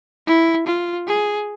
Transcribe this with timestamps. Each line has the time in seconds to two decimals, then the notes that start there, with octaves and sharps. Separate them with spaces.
0.27 E4
0.67 F4
1.07 G#4